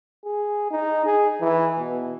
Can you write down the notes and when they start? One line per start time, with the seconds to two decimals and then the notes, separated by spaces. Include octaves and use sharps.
0.25 G#4
0.71 D#4
1.05 G#4
1.41 E3
1.77 B2